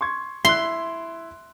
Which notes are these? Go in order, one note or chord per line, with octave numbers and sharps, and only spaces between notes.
C6 C#6 G#6
E4 C6 F#6